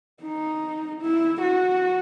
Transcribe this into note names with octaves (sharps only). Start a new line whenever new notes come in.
D#4
E4
F#4